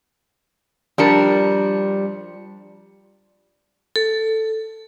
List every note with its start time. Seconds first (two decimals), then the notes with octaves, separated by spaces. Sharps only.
0.98 F3 G3 D4 A#4 C#7
3.96 A4